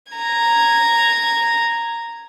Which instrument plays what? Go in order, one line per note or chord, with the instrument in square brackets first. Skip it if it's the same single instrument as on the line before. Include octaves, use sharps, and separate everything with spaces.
[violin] A#5 G#6